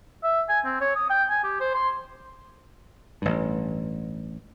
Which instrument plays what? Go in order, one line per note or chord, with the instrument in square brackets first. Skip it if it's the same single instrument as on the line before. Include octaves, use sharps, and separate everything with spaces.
[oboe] E5
G#5
C4
C#5
D#6
G5
G#5
G4
C5
C6
[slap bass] A1 G2